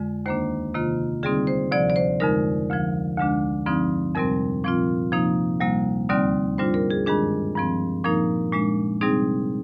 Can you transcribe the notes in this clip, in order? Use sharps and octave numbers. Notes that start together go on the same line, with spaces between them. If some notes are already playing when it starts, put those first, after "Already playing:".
Already playing: F2 D3 G#3
D#2 D#3 A#3 D4 C5
C3 D#3 A#3 F4
D3 G3 C4 D#4 G#4
C5
D2 C3 F3 D5
D5
C5
F2 D3 G#3 D#4 A#4
D2 D3 F3
D2 D3 G#3 D4
G2 D3 F3 C4 D#4
F2 C3 G3 C4 A#4
A#2 F3 C4 F4
C3 F3 A#3 D#4
D2 C3 G3 A#3
D#2 D3 G3 C4 D#4 D5
G#2 G3 D4 F4 C5
A#4
G#4
G2 D#3 G#3 D4 G#4
G2 F3 C4
A#2 F3 A#3 D#4 A#4
A#2 G#3 D4
C3 G3 C4 D#4 G#4